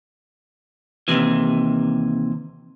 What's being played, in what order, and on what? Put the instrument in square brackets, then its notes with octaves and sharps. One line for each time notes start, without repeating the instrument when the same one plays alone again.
[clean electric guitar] D#2 C3 E3